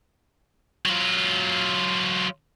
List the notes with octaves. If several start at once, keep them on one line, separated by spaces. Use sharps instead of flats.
F#3 F4